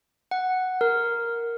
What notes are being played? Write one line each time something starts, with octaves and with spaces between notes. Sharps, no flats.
F#5
A#4